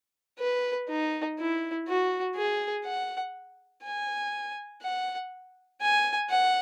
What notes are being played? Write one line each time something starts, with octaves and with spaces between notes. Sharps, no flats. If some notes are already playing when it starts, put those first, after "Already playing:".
B4
D#4
E4
F#4
G#4
F#5
G#5
F#5
G#5
F#5